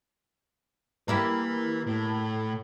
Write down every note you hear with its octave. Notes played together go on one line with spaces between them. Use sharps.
A#3 E4 G4 B4 E5
A2